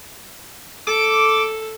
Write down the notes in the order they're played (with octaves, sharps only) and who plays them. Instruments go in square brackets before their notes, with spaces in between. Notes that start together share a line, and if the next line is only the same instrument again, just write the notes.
[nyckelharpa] A4 [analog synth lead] D6